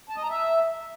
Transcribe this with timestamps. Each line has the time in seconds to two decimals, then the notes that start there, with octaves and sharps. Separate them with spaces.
0.09 A5
0.16 D#5
0.23 A#5
0.30 E5